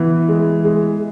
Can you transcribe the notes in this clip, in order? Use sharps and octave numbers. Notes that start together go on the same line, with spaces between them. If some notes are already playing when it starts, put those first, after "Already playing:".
Already playing: E3 B3
G#3
G#3